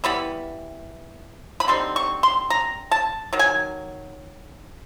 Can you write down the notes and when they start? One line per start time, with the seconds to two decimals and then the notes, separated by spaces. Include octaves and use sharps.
0.04 E3 G3 B3 B5
1.60 B5
1.68 D3 G3 C4 D#4 C6
1.96 C#6
2.23 C6
2.50 A#5
2.91 A5
3.33 D#3 F#3
3.39 G#5